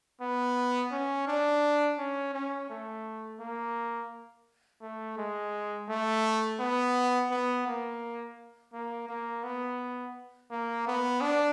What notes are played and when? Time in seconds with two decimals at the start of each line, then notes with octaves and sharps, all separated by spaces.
0.21 B3
0.92 C#4
1.27 D4
1.98 C#4
2.33 C#4
2.70 A3
3.40 A#3
4.82 A3
5.18 G#3
5.89 A3
6.59 B3
7.31 B3
7.67 A#3
8.73 A#3
9.09 A#3
9.44 B3
10.51 A#3
10.87 B3
11.21 D4